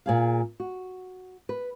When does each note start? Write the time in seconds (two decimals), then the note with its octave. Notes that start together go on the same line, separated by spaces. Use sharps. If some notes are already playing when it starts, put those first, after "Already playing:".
0.06 A#2 G#4 F5
0.60 F#4
1.49 B4